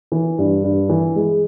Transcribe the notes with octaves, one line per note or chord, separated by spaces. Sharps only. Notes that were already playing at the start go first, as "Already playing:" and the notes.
E3
G2
G2
E3
G#3